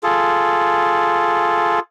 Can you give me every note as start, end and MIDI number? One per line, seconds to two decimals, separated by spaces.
0.03 1.80 65
0.03 1.80 68
0.03 1.80 69